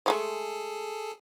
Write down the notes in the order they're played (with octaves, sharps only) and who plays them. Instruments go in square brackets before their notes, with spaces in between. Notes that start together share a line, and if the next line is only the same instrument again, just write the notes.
[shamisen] F3 G#3 A3 [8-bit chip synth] G#4 A4